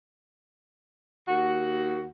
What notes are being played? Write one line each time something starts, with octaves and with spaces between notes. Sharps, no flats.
D#2 F#4